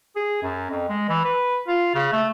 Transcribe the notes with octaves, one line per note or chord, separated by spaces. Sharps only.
G#4
F#2
F2
G#3
E3
B4
F4
C#3
A3